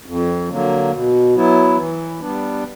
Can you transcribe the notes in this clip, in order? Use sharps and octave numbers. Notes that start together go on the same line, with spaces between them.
F2
D3 F#3 A#3
B2
F#3 B3 E4
E3
G3 B3 D4